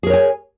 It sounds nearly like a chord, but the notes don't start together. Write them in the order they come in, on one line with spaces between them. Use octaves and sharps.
G#4 A#4 C#5 G#5